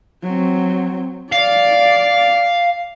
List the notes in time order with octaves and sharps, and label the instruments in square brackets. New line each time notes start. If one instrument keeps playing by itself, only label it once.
[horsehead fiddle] F#3 C4
[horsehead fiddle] D5 [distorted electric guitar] F5